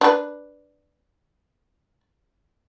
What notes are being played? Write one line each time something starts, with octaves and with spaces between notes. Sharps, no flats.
D4 B4